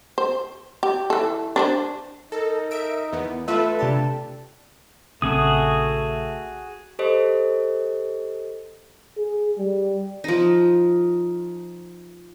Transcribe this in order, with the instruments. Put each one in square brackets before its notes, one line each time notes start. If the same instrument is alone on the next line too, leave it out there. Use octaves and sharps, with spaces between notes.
[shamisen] C5
G4
E3 A4
D4 B4 C5
[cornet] D#4 [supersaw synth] A4 [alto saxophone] A#4
[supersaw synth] E5 D7
E2 B3
[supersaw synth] A3 F4 B4 [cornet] A4 [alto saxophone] E5
[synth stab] C3 G4 A5 [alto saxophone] D4
[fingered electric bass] A#1 C#3 C4 [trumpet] A3 [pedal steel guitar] F#4 G#4 D#6
[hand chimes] G4 A4 C5 D#5
[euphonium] G#4
G3
[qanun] F3 D#4